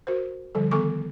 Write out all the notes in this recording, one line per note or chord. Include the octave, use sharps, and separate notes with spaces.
F#4 A#4 C5
D3 F3 G3 A4
D#3 B3 A4 G#5 C#6 D6